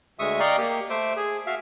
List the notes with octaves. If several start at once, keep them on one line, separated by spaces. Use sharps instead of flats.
D2 G#3 E5 C#6 D#6
D5 D#5 F5 G5 A#5 C#6
A#3 G4
A3 C5 E5 D6
G#4
F#4 E5 F5